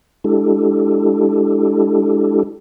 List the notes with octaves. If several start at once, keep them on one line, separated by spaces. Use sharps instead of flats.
G#3 D4 E4 G4 A4